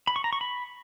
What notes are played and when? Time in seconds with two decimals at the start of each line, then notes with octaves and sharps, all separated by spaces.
0.07 B5
0.16 C#6
0.24 A#5
0.33 C#6
0.41 B5